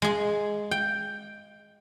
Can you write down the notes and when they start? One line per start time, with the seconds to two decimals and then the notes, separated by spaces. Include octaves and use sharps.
0.02 G#3 G#4
0.71 G5